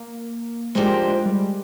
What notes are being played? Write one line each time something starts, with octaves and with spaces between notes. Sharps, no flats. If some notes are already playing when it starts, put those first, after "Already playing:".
Already playing: A#3
F3 G#3 A#3 D4 G4 C5
G3